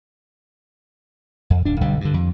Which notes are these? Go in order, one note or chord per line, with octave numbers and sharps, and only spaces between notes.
F2
D1 D4
B1 D3 G3
G2 D3
F2